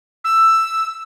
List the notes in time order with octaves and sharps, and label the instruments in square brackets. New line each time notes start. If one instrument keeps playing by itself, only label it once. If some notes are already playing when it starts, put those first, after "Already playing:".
[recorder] E6